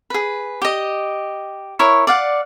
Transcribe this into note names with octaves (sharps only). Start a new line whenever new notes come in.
G#4 B4
G4 D#5
E4 A#4 C#5 C#6
D5 F5 F#5